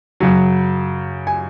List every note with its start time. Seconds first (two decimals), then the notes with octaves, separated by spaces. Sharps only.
0.20 F#2 C#3 F#3
1.27 G#5